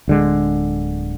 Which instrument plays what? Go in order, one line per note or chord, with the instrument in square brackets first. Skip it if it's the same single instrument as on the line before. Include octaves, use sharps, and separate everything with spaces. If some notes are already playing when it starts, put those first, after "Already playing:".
[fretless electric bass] D1 D3 G#3